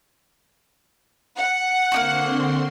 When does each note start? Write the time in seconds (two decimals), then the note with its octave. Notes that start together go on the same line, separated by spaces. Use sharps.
1.39 F#5 C#7
1.92 D3 A#3 C4 D#4 F#4 C6